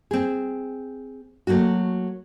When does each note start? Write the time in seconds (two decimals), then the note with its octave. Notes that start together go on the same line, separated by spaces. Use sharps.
0.11 C4 G#4
1.47 F#3 A3 A#3 F#4